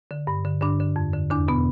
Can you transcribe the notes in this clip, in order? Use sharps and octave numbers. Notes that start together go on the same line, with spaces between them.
D3
G2
D3
G2 D3 D4
D3
F2
D3
E2 D3 D4
B2 B3